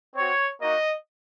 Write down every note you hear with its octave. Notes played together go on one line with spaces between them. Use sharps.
C4 F#4 C#5
A#3 D#4 F#4 D#5